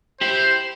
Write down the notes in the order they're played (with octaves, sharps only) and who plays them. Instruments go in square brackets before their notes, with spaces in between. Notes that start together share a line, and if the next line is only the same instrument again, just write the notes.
[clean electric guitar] E4 G4 [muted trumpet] C5